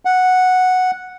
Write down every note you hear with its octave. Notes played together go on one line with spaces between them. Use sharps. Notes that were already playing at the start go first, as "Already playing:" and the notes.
F#5